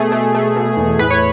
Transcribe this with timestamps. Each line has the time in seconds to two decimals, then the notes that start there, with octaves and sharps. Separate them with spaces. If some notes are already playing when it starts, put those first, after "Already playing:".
Already playing: B2 A3 G#4
0.12 A3
0.35 A3
0.56 B2
0.77 E2
0.99 A2 B4
1.11 C#5